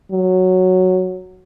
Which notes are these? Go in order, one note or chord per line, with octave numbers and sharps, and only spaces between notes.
F#3